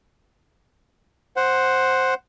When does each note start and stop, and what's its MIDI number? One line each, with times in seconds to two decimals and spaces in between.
1.36 2.14 72
1.36 2.14 78